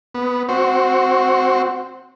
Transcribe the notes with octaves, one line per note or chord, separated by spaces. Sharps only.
B3
C4 F#4 C5 C#6